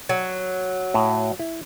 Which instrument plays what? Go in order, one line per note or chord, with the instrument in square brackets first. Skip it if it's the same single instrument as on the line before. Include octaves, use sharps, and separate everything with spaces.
[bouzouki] F#3
[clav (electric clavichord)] A2
E4